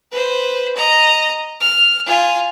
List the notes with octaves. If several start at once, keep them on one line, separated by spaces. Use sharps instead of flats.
B4 C5
D#5 A#5
F6
F4 G#5